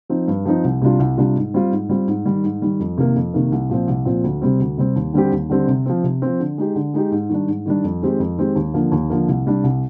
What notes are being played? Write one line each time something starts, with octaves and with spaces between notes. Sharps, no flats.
F3 C4 D#4
G2
F3 C4 D#4
C2
C3 G3 D4 F4
C2
C3 G3 D4 F4
G#2
G3 C4 F4
G#2
G3 C4 F4
G#2
D#3 G3
G#2
D#3 G3
F2
C3 D#3 A#3
F2
C3 D#3 A#3
C2
A#2 F3 C4
C2
A#2 F3 C4
D2
C3 G3 C4
D2
C3 G3 C4
D#2
D3 G3 C4 G4
D#2
D3 G3 C4 G4
C3
F3 C4
C3
F3 C4
D3
G#3 D#4 G4
D3
G#3 D#4 G4
G#2
D#3 G3 D4
G#2
D#3 G3 D4
F2
D#3 G#3 C4 G4
F2
D#3 G#3 C4 G4
D#2
D3 F3 A#3
D#2
D3 F3 A#3
C2
C3 G3 D4
C2